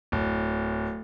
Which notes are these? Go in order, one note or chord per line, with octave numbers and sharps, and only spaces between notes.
D1